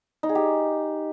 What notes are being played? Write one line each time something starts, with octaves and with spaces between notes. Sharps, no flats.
D#4
G#4
G4